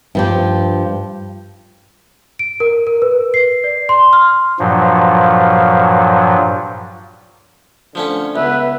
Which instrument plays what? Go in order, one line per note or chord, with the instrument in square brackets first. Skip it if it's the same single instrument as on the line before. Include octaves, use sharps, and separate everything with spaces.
[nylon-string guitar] G2 F3 G4
[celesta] D7
A#4
A#4
B4
C7
D5
C6
F6
[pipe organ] G2 A#2 F3 F#3
[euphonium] D3 [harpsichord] F3 A3 C#4
[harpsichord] C#2 [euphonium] B3 [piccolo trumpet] B4 [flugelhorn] E5